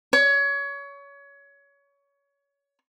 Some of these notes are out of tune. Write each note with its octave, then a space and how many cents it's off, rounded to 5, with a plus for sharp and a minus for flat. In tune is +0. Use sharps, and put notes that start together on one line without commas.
C#5 +25